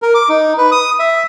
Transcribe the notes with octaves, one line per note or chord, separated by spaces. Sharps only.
A#4
D6
D#4
B4
D#6
E5